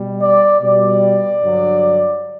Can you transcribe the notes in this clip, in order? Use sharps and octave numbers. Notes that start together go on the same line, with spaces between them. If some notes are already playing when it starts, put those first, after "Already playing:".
Already playing: B2 G3
D5
B2 G3 D5
G2 D3 F#3